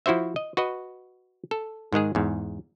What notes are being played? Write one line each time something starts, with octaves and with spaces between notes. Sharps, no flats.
F3 E4 F#4 C5 E5
D#5
F#4 B4 D#5
A4
G#2 D#3 G#3 G#4
E2 G#2